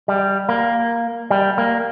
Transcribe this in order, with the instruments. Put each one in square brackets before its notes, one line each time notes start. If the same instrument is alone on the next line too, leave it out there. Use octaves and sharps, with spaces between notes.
[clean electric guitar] G3
A#3
G3
A#3